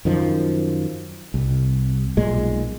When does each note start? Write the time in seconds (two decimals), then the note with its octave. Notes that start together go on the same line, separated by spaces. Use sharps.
0.05 F#2 D#3 F3
1.34 C2
2.17 B1 A#2 G#3